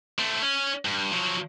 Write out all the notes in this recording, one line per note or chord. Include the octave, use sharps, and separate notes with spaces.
A3 C4
C#4
G2
F3 F#3